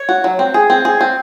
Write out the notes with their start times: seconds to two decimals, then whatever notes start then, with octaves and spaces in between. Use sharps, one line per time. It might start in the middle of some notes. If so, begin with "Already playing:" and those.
Already playing: C#5
0.09 F#4
0.24 F#3
0.39 C4
0.54 G#4
0.70 C4
0.85 G#4
1.01 C4